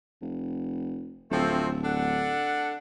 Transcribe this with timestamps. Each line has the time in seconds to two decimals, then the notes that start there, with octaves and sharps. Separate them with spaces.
0.21 F1
1.31 D1 F3 A3 C4
1.83 D4 A4 F#5